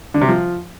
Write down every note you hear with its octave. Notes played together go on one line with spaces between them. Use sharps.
D3
C3
F3